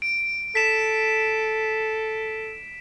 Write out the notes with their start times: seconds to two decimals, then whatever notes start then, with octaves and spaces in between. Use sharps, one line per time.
0.02 D7
0.55 A4 B6 E7